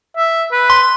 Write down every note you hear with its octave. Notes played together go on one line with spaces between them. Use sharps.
E5
B4
C6